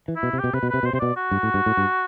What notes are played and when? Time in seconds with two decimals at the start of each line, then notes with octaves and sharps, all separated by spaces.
0.08 E3
0.16 E4
0.23 B2
0.33 C3
0.39 B2 G4
0.53 C3 B4
0.63 B2
0.70 C3 B4
0.83 B2 C5
0.93 C3 C5
1.00 B2 D5
1.16 F#4
1.31 G2
1.43 A2
1.54 G2
1.66 A2
1.77 G2